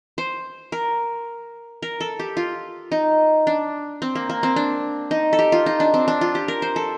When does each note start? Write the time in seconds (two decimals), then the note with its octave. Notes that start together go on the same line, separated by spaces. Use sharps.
0.18 C5
0.72 A#4
1.82 A#4
2.00 A4
2.19 G4
2.37 F4
2.92 D#4
3.47 D4
4.02 C4
4.15 A#3
4.30 A#3
4.43 C4
4.56 D4
5.11 D#4
5.33 A4
5.39 G4
5.52 F4
5.66 D#4
5.80 D4
5.94 C4
6.08 D4
6.21 F4
6.35 G4
6.48 A#4
6.62 C5
6.76 A4